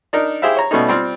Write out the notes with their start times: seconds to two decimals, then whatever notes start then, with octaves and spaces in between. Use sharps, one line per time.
0.13 D4 D#4 A#4
0.42 E4 G4 G#4 C5 E5 F5
0.57 C#5 A#5
0.71 B2 G3 A3 C#4 D#4
0.88 G3 C4 F4